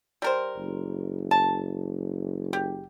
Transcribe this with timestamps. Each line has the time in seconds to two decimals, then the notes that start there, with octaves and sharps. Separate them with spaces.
0.22 G3 A#4 C5
0.57 F#1
1.31 A5
2.53 G4